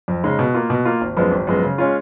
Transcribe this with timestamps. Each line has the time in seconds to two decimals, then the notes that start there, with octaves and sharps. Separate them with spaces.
0.08 F2
0.24 C#3 G#3 D#4
0.39 B2
0.54 A#3 F4
0.70 B2
0.85 A#3 F4
1.01 G#1
1.17 F#2 F3 G#3 B3
1.32 G#1
1.47 F#2 F3 G#3 B3
1.63 C#3
1.78 G#3 C#4 F4